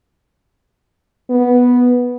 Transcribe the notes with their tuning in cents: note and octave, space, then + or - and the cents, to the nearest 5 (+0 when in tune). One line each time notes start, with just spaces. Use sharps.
B3 -5